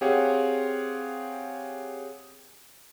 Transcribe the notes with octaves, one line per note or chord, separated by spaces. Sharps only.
C4 G4 G#4 C#5 F5 F#5